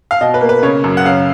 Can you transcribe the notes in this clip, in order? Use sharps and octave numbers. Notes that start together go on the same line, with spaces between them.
F5
B2 D#5
B4
A#3
B4
C#3 C#5
F#2
F#5
C#3 F5